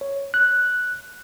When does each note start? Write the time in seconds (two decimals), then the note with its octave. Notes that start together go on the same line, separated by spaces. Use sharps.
0.01 C#5
0.34 F#6